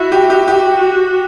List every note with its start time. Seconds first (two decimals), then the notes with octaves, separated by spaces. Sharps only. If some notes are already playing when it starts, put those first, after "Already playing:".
Already playing: E4 F#4
0.12 G4
0.30 G4
0.48 F#4 G4